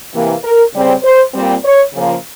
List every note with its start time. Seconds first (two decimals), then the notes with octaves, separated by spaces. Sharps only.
0.13 C3 E3 A#3
0.44 A#4
0.74 C#3 G3 C4
1.03 C5
1.34 A#2 G3 C4
1.64 C#5
1.93 C#3 F3 A#3